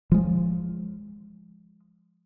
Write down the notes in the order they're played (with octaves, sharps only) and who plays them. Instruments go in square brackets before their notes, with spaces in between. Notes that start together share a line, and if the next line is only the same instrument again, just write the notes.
[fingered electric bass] F3 G#3